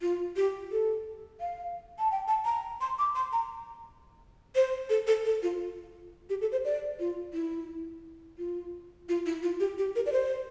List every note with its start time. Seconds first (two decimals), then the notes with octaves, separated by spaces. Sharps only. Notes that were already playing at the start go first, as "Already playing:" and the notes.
0.02 F4
0.36 G4
0.72 A4
1.40 F5
1.99 A5
2.11 G5
2.28 A5
2.45 A#5
2.81 C6
2.99 D6
3.15 C6
3.33 A#5
4.55 C5
4.90 A4
5.07 A4
5.25 A4
5.43 F4
6.30 G4
6.41 A4
6.52 C5
6.65 D5
7.00 F4
7.33 E4
8.38 F4
9.09 F4
9.26 E4
9.43 F4
9.60 G4
9.78 G4
9.96 A#4
10.06 D5
10.12 C5